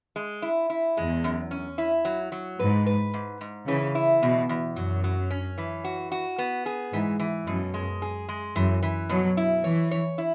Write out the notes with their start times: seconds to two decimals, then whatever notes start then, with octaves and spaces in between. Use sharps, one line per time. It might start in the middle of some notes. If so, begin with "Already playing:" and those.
0.16 G#3
0.42 E4
0.70 E4
0.97 E2 G#3
1.24 F#2
1.51 C#4
1.78 E4
2.05 F#3
2.32 F#3
2.59 G#2 B4
2.86 B4
3.14 G#2
3.41 G#2
3.68 C#3 E3
3.95 E4
4.22 E2 B2
4.49 E2
4.76 F#2 F#3
5.04 F#3
5.31 C#4
5.58 E3
5.84 F#4
6.12 F#4
6.38 B3
6.66 G#4
6.93 G#2 E3
7.20 E3
7.47 F#2 B2
7.74 G#3
8.02 G#4
8.29 G#3
8.56 F#2 E3
8.83 E3
9.09 B2 F#3
9.37 E4
9.64 E3 C#5
9.91 C#5
10.18 E4